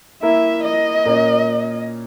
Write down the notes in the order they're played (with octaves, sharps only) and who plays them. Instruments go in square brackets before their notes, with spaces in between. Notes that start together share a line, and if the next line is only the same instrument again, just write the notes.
[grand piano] A#3 E4 A#4 [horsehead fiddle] E5
[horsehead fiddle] D#5
[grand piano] A#2 A#3 C#4